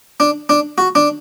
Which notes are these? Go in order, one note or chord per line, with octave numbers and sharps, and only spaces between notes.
D4
D4
F#4
D4